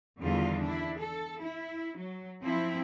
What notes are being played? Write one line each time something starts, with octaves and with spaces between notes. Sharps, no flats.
E2 D3 D#3 G3 F4
D4 E4
A4
E4
F#3
F3 C4 E4